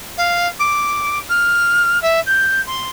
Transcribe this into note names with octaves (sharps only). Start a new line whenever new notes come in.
F5
D6
F6
E5
G6
C6